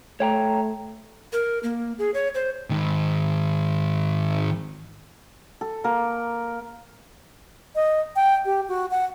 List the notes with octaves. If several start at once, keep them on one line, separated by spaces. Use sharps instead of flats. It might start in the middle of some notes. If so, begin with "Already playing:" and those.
A3 C#5 G5 A#5
A#4
A#3
G#4
C#5
C5
G#2 D#3
A4
A#3 A#4
D#5
G5
G4
F#4
F#5